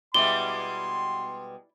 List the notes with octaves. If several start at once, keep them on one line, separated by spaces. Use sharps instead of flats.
B2 G3 G#3 E4 F4 D5 C6 G7